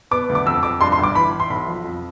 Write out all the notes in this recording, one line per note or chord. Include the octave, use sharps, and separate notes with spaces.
B3 D6
D2
D6
F2 E6
F2 D6
G2 C6
C6
G1
D6
E3 B5
E3
C6
B1 B5
F3
F2